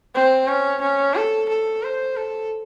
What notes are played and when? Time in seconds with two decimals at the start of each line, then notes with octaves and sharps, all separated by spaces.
0.15 C4
0.48 C#4
0.81 C#4
1.15 A4
1.49 A4
1.83 C5
2.16 A4